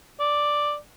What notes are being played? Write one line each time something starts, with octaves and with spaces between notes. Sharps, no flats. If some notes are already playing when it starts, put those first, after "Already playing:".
D5